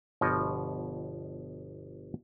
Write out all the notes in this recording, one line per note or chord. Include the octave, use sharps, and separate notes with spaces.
G1 B2 F3 C#5 D#5 G5